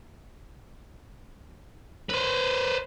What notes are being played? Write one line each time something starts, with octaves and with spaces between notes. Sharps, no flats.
B4 C5